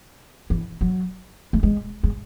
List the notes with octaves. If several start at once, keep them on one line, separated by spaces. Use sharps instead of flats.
E3
F#3
A3
G#3
G#3